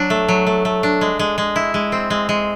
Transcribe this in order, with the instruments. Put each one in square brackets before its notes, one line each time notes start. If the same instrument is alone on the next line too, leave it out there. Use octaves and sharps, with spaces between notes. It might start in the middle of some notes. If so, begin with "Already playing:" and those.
Already playing: [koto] F#3 D4
A3
F#3
A3
A3
D4
G#3
G#3
G#3
E4
G#3
C4
G#3
G#3